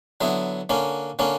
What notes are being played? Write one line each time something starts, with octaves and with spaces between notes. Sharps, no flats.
D3 F#3 B3 E4
D3 A#3 C#4
D3 A#3 C#4